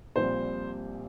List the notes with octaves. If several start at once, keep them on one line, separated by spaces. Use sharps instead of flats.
A#1 A#2 G3 C4 C5